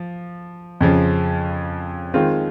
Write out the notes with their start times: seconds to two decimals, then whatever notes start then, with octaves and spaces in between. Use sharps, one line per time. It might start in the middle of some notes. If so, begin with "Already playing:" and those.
Already playing: F3
0.80 F2 C#3 F3
2.14 D#3 G#3 C4 F4